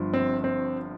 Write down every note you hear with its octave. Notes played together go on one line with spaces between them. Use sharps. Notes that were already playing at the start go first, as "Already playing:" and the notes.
Already playing: G1 G2 F3
C4
C4